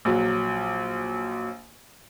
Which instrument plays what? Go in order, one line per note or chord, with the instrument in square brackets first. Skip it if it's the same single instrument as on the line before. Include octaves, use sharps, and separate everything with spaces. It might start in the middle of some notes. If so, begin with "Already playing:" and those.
[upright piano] A#1 F#3